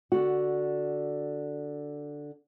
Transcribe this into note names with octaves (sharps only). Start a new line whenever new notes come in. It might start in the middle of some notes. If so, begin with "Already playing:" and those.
D3 F#4